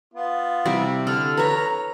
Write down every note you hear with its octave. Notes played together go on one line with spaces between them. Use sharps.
B3 F4
C3 G3 E4
D3 A4 F6
B4 C#5 A#5